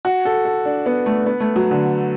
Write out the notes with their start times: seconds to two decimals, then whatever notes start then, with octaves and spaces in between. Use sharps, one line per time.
0.05 F#4
0.25 A4
0.45 A4
0.65 D4
0.86 B3
1.06 A3
1.26 B3
1.40 A3
1.56 F#3
1.71 D3